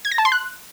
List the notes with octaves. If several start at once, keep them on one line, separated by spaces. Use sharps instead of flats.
G#6
A#6
A5
C6
F#6